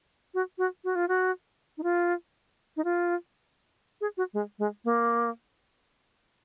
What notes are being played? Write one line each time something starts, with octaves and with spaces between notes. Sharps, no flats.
F#4
F#4
F#4
F4
F#4
D#4
F4
D#4
F4
G#4
F#4
G#3
G#3
A#3